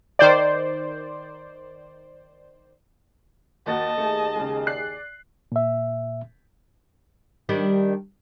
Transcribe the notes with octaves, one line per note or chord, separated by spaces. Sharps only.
D#3 C5 D5
D#2 F#4 D#5 A5 A6
D#2 A3 G#4
C#3 G#3
D5 F#6 C7
A#2 E5
D#3 G3 D4